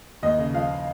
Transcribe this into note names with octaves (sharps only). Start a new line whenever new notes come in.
D#2 D#5
C#3
F3 F5